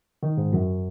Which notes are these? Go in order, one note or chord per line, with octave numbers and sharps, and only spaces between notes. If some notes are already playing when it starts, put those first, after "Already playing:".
D#3
G#2
F#2